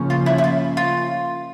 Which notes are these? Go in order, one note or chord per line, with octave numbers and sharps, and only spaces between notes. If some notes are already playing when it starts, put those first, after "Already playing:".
Already playing: C#3 F3 A#3 C#4
F4
E4
E4
F4
F4